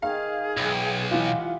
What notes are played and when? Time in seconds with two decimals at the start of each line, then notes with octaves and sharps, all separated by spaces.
0.02 D#3 G#4 F5
0.57 B1 E3 F4 G5
1.11 E3 G#3 F4 G4 F#5